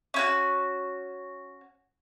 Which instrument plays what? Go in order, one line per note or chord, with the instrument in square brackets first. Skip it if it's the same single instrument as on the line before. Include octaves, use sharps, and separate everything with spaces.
[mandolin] C#4 E4 F#4